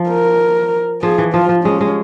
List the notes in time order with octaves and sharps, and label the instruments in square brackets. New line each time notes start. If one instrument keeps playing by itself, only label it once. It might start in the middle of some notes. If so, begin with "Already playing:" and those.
Already playing: [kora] F3
[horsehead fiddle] A#4
[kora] F3 [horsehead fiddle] G#4
[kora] E3
[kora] F3 [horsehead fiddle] F4
[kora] F3
[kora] G#3 [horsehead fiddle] C#4
[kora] G#3